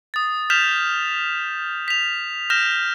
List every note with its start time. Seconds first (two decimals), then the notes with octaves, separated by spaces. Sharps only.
0.14 D#6 A6
0.50 F6 G6 B6 E7 F7
1.88 B6 F7
2.50 F6 G6 A#6 E7